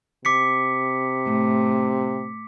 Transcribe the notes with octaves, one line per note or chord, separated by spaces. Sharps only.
C3 D6 B6 C#7
A2